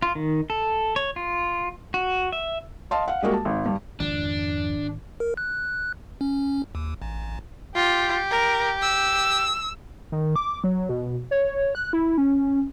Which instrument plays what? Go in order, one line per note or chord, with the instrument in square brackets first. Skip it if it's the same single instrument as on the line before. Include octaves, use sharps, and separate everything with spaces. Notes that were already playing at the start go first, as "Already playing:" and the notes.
[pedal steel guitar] F4
D#3
A4
C#5
F4
F#4
E5
[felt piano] D#5 F5 A5 C6
F5 F#5
G3 G#3 A#3 F#4
A5
G#1
G2
[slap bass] G#1 [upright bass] F2 [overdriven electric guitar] D4
[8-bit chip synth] A#4
F#6
C#4
D#2
A1
[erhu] F4 [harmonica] G4
[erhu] A#4
E6
[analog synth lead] D#3
D6
F#3
B2
C#5
F#6
E4
C#4